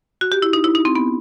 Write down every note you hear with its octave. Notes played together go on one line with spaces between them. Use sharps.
F#4
G4
E4
D#4
E4
D#4
C4
B3